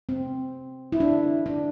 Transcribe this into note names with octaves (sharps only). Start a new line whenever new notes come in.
C4
E4
D4
D4